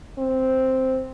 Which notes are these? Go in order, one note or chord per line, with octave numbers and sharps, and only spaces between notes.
C4